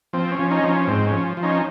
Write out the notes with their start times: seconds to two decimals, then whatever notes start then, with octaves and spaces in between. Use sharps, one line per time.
0.13 F3 C4
0.32 C#4
0.39 F3
0.51 C#4 D#4
0.64 F3
0.69 C#4
0.87 G#2 C4
1.07 C#4
1.12 F3
1.37 F3
1.43 C#4 D#4